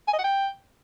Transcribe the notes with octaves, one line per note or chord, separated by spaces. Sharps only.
G#5
D#5
F#5
G5